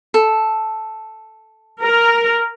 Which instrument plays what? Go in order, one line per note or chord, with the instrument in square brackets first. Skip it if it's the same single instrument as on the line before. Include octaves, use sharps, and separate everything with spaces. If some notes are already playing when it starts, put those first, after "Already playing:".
[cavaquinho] A4
[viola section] A#4